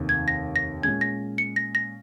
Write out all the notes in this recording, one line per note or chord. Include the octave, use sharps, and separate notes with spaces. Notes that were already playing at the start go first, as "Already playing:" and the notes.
Already playing: F1 D#2 D#3
G#6
A#6
A#6
A#2 G#3 C#4 G#6
A#6
C#7
A#6
A#6